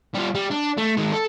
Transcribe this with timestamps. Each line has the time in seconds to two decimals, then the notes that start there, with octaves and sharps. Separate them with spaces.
0.15 G3 F4
0.35 G3
0.51 D4
0.78 A3
0.97 D#3 G#3
1.12 A4